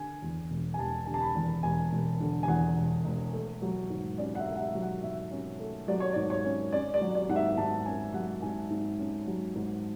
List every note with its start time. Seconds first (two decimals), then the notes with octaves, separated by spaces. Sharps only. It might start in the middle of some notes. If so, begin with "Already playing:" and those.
Already playing: D3 G#5
0.22 E2
0.50 E1
0.74 G#5
0.79 E1 A5
1.06 D3 G#5
1.14 A5
1.21 B5
1.35 E2
1.63 E1 G#5
1.92 E1
2.20 D3
2.43 G#5
2.48 E2 F#5
2.77 E1
3.05 E1
3.33 A3
3.62 F#3
3.90 G#2
4.18 C#4 D5
4.35 F#5
4.39 E5
4.46 A3
4.56 F#5
4.60 E5
4.75 F#3
4.82 F#5
5.03 G#2 E5
5.31 C#4
5.60 A3
5.88 F#3 D5
6.00 C#5
6.12 G#2 D5
6.30 C#5
6.44 C#4
6.72 C#4 D5
6.94 D5
7.01 F#3
7.15 D5
7.29 G#2 F#5
7.36 E5
7.57 G#2 A5
7.86 C#4 G#5
8.14 F#3 F#5
8.42 G#2 G#5
8.70 G#2
8.99 C#4
9.27 F#3
9.55 G#2